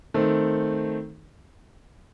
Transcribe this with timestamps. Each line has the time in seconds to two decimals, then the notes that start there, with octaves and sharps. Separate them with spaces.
0.14 D#3 A3 C4